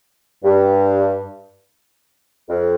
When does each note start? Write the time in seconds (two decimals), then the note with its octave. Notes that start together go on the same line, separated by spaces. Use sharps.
0.43 G2
2.49 F2